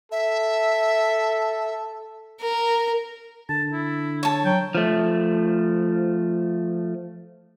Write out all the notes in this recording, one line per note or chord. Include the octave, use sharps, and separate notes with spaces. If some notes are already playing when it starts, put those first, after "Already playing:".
A4 E5
A#4
D3 A5
E4
C#5 A5
F#3 G5
F3 A3